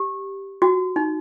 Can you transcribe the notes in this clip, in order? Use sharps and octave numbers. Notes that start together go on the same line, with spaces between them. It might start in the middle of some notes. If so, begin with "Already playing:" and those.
Already playing: G4
F#4
D#4